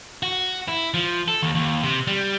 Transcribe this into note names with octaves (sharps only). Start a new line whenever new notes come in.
F#4
E4
F3
A4
D#2
D#2
C3
G3